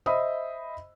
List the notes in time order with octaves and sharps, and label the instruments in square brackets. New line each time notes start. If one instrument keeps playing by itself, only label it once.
[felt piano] C5 D#5 E5 B5 D#6